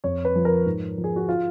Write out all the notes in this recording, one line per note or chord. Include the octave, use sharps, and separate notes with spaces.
F2 C#5
B4
F3
A#4
G#2
F3
G#4
F#4
F4